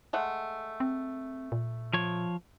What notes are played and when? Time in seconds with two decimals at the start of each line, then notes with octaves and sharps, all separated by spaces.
0.13 G#3 A3 F#5
0.80 C4
1.52 A#2
1.94 F3 C#5